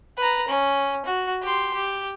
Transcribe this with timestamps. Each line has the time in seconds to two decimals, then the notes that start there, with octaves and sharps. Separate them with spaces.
0.17 B4 A#5
0.48 C#4
1.06 F#4
1.42 G4 C6
1.74 G4